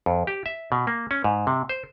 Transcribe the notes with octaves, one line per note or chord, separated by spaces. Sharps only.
F2
G4
E5
B2
A#3
C#4
G#2
C3
C5